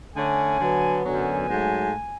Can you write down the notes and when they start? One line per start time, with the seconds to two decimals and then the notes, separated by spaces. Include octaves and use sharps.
0.14 D3 A3 C#4 G#5
0.59 D3 F#3 B3
1.03 F#2 D3 F#3 B3 G#5
1.48 G#2 F#3 A3